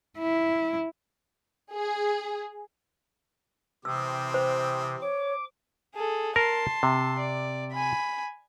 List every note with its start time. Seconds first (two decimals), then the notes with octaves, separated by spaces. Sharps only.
0.19 E4
1.74 G#4
3.85 C3 E3 C4 D#6 E6
4.34 C5
5.02 C#5 D6
5.94 G#4 A4
6.36 A#4 A5 C6
6.83 C3
7.20 D5
7.72 G#5 B5